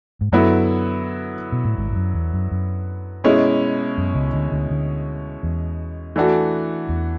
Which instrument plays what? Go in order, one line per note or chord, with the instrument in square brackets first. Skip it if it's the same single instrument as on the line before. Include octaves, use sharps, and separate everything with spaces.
[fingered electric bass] G#2
[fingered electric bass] F#2 [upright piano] D3 F#3 B3 E4
[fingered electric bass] B2
A2
G#1 G#2
G#2
F#2
E2
F#2
F#2
[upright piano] B2 G#3 C#4 E4
[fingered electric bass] F#2
C#2 C#3
D2 D3
D2 D3
D2 D3
E2
[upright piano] E3 A3 D4 F#4
[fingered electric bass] E2